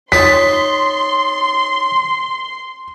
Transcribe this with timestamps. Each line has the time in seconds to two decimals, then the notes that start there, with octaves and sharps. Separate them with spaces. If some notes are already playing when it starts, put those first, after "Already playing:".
0.12 D#4 C#5 A5 C6 B6